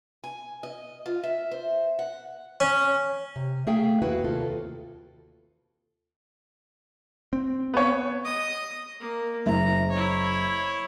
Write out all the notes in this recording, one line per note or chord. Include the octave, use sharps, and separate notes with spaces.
G#5
D#5
F4
E5
C5
F#5
C#4
C3
A3 A#3 G#4 E5 F5 G5
E2 E4 F#4 B4 F5
D#2 C3 F4 A4
C4
B3 C#5
D#5 D#6
A#3
F#1 E5 A#5
E4 C#5